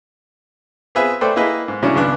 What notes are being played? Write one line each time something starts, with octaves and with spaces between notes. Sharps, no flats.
B3 C4 F4 G#4 B4 E5
A3 A4 B4 C5 D5 G5
A#3 E4 G#4 B4 D#5 E5
G#2
A2 C#3 F#3 C#4 D4
G#1 C#2 B3 D4 F#6